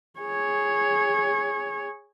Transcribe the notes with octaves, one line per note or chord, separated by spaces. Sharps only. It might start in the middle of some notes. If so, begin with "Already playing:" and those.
G#4 C#5